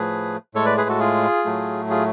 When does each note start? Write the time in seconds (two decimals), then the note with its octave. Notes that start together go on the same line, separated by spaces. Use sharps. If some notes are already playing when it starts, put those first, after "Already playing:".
Already playing: A2 F3 A3 G#4 B4
0.54 A2 G#3 A4 C#5
0.66 B4 D5
0.77 G#4 B4
0.89 F#4 A4
1.00 F4 G#4
1.45 A2 F#3 A3
1.90 F4 G#4